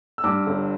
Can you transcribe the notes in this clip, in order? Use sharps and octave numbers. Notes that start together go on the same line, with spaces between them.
E6
G2 D6
G1